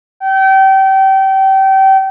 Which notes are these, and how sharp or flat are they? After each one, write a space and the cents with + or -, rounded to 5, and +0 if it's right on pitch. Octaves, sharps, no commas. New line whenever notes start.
G5 -30